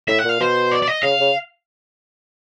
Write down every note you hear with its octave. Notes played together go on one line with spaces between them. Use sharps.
A2 E5
F#5
A#2 F5
B2 C5
D5
D5
D#5
C#3 F5
C#3